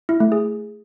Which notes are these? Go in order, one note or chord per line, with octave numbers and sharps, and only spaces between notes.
E4
A3
G#4